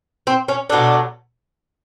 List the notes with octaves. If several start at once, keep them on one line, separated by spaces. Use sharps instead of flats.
C4
C#4
B2 F#3 A3 D4